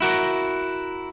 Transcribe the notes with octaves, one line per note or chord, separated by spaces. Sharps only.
E4 F#4 A#4